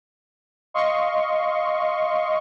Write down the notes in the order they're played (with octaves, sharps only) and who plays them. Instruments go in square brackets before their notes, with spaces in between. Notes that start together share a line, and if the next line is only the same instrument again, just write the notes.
[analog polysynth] D#5 F5 C6 C#6